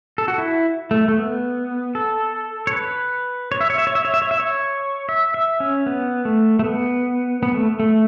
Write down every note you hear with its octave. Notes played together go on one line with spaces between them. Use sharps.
A4
F#4
E4
A3
A3
B3
A4
C#5
B4
C#5
E5
C#5
E5
C#5
E5
C#5
E5
C#5
E5
C#5
E5
E5
C#4
B3
A3
A3
B3
B3
A3
A3